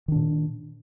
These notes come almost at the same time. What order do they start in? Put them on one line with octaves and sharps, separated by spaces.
D#3 D4 A#2